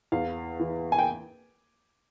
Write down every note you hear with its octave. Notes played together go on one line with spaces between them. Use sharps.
E2 F5
E3
G#5
G5